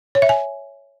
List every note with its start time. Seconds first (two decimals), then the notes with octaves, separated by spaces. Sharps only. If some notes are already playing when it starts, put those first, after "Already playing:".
0.15 C#5
0.22 E5
0.29 G#5